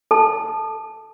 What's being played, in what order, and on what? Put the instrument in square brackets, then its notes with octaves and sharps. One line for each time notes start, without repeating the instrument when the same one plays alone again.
[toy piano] A4 A5